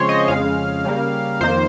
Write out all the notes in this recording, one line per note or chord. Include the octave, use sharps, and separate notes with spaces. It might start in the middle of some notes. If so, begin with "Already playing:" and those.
Already playing: C#3 F3 G#3 C4 C5 C#5
D#5
F2 C#3 G#3 F5
C#3 G3 A#3
F2 D#3 A#3 C5